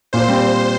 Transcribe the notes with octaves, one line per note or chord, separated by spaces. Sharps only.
A#2 C5
G3 C4